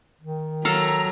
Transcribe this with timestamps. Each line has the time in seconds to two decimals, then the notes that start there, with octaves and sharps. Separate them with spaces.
0.21 D#3
0.65 F#3 A4 F5 A#5